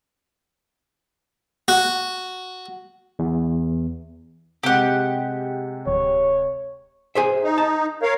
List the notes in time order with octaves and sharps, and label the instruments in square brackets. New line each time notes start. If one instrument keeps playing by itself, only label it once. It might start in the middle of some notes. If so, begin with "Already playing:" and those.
[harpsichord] F#4
[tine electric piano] E2
[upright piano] C3 G#3 [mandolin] G4 F#5
[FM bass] D1 [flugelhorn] C#5
[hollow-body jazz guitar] G#4 C5 E5
[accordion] D#4
[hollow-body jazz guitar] A5
[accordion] A#4 C#5 F5